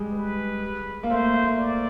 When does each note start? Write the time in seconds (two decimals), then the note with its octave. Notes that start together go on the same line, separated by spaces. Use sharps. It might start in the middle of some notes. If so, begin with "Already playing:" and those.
Already playing: G3 G#3
0.13 B4
1.03 A#3
1.10 A3 C5
1.34 A3
1.59 D5